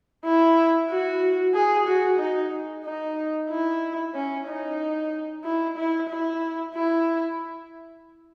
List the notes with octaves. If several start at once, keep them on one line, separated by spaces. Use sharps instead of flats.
E4
F#4
G#4
F#4
D#4
D#4
E4
C#4
D#4
E4
E4
E4
E4